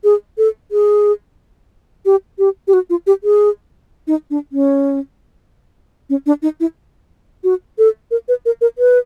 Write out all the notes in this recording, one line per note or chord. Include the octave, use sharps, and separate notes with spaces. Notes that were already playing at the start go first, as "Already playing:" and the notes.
G#4
A4
G#4
G4
G4
G4
F#4
F4
G4
G#4
D#4
D4
C#4
C#4
D4
D#4
E4
F#4
A4
A#4
B4
A#4
A#4
B4